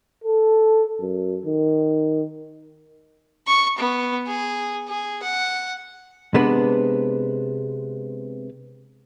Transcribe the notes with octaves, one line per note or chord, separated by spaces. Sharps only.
A4
F#2
D#3
C#6
B3
G#4
G#4
F#5
C3 G#3 B3 D4 B4